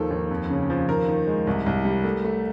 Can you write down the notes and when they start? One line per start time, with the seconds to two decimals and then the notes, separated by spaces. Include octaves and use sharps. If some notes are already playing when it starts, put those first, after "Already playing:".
Already playing: D#2 D#3 F3 A4
0.11 D#2
0.31 F2
0.50 C#3
0.70 F3
0.88 D#2 A#4
1.08 D#3
1.27 G#3
1.47 C2
1.66 C2
1.85 G3
2.05 A3
2.24 A3